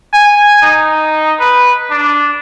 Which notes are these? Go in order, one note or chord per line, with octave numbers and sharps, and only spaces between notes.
G#5
D#4
B4
D4